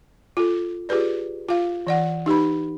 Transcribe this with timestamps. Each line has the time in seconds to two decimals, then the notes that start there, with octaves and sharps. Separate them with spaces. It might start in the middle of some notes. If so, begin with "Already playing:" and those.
0.37 F4 A4
0.89 F4 G4 G#4 B4 D5
1.49 F4 F5
1.87 E3 D5 F#5
2.26 D#4 G4 B4 B5